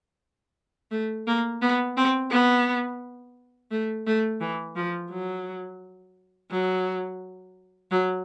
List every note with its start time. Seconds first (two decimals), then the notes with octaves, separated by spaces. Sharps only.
0.91 A3
1.27 A#3
1.62 B3
1.97 C4
2.31 B3
3.71 A3
4.07 A3
4.41 E3
4.76 F3
5.11 F#3
6.51 F#3
7.91 F#3